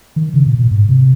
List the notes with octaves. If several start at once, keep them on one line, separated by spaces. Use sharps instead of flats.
D#3
C#3
A#2
A#2
G#2
C3